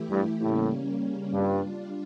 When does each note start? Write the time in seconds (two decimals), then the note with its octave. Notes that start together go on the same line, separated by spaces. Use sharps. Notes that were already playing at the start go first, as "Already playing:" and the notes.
Already playing: E3 A3 E4 G4
0.11 G2
0.41 A2 C#3 G3 A#3 C#4
1.32 G2 G3 D4 F4